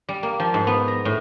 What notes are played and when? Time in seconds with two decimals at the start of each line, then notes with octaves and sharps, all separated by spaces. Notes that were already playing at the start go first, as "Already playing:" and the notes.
0.09 G3
0.23 A#3
0.40 F3
0.54 G#2
0.67 B3
0.88 A#5
1.05 A2